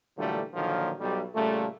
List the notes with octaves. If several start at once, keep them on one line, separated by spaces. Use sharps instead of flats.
A#2 D3 E3 F#3 G3 A3
A#2 D3 D#3 F3 F#3 A#3
B1 G3
A#2 C#3 G3 A3